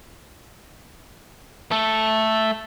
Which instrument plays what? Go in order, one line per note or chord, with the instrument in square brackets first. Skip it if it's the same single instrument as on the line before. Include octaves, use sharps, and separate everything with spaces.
[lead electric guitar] A3 A4